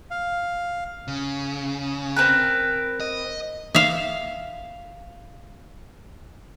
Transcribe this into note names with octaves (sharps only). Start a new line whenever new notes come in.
F5
C#3
C4 A#4 B4
D#5
E5 F5